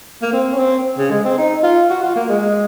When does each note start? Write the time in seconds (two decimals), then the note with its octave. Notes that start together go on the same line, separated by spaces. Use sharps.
0.22 A#3
0.33 C4
0.54 C#4
0.59 C4
0.98 C#3
1.11 G#3
1.25 C4
1.38 D#4
1.63 F4
1.90 F#4
2.03 F4
2.16 A#3
2.29 G#3